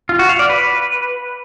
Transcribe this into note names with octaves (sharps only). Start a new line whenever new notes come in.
F4
F#4
F5
D5
B4